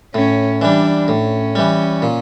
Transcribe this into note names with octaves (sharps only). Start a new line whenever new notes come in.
A2 C#4
E3 G3 D4
A2 C#4
E3 G3
A#2